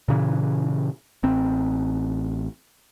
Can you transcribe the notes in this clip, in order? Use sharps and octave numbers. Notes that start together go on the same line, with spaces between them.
A#2 C#3 E3
A1 C4